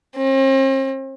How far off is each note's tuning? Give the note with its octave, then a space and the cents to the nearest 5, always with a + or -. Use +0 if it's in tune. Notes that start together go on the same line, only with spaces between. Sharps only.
C4 +45